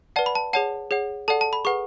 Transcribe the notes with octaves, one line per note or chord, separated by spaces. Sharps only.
B4 D5 F#5 A5
B5
A5
G#4 C#5 F#5 A5
G#4 C#5 F#5
A4 D5 F#5 A5
A5
B5
G#4 B4 F#5 C#6